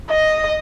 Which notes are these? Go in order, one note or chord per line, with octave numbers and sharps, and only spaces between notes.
D#5